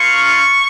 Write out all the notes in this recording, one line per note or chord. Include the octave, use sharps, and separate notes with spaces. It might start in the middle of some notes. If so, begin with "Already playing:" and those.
Already playing: A#3 F4 C#6